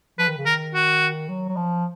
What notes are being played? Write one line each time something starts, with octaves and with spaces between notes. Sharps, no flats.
F3 B4
D#3
C#3
D#3 A#4
F#4
F#3
F#3
F3